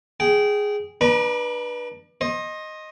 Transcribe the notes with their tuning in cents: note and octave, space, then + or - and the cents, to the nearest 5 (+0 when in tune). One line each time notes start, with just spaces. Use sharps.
G#4 +0 G5 -25
D4 +25 B4 -20 A#5 +45
C5 +35 D#5 +0